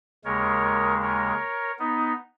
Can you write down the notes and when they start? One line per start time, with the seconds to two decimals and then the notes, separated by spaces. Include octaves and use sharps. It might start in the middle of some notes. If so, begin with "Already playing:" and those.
0.25 D#2 C#3 G#3 A#4 C#5
1.02 A#4 C#5
1.79 B3 D#4